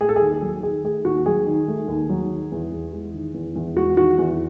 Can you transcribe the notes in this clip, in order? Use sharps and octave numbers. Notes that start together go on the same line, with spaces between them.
A3 G#4
A4
G#4
D#2
G#4
F#3
D#3 G#4
A3 G#4
D#2 F#4
F#3 G#4
D#3
A3
D#2
F#3
D#3
E2
E2
G#3
D#3
E2
E2
G#3 F#4
D#3 F#4
E2